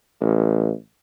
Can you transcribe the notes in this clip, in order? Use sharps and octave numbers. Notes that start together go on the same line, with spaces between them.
A1